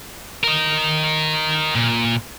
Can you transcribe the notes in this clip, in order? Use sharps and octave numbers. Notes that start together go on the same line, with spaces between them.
A#4 D#5
A#2